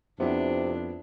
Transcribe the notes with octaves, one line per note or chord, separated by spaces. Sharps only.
F2 C3 B3 D4 E4